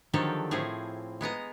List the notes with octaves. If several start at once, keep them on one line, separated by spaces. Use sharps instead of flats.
D3 D#3 F3 F#3 G4 A4
A2 F3 C4 E4 G#4
G#3 B3 D#5 A#5